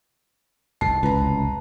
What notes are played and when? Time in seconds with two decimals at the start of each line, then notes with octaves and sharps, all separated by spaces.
0.81 F1 C2 A5 C7
1.03 C#2 B4 A#5